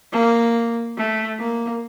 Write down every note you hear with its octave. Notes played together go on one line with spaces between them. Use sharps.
A#3
A3
A#3